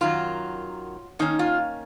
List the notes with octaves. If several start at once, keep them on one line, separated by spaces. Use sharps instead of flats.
F#2 D#3 F#3 F4
D#3 A#3 C#4 D#4
F4